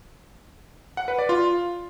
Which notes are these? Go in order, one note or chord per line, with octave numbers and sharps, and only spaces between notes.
F#5
B4
D5
F4